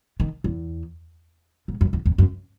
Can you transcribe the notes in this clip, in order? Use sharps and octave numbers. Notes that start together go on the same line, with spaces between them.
D#3
E2
G#2
F#2
E2
E2
F#2